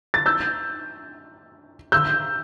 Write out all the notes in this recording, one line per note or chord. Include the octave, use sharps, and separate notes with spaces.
A6
E6 G6
E6 G6